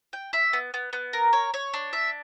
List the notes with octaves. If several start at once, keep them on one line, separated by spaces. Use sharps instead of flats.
G5
E5
B3
B3
B3
A#4
C#5
C#5
D4
E5